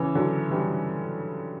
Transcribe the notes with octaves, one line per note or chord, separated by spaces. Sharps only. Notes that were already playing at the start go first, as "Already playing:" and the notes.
Already playing: C#3 E3
D3 F#3
E3 G3